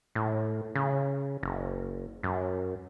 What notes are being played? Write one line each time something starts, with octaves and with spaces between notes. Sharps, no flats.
A2
C#3
F#1
F#2